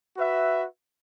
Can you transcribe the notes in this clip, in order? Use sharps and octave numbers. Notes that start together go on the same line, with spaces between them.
F#4 B4 E5